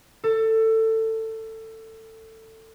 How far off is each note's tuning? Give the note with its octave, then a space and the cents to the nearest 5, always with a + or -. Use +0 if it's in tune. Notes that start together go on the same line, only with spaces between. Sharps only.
A4 +20